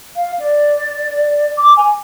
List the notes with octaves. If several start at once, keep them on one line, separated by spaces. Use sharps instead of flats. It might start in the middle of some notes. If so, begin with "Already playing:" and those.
F5
D5
D6
G#5